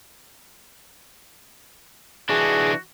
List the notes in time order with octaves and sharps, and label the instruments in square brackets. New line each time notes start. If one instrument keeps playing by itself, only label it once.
[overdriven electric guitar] E3 D4 [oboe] F#4 [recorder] G#4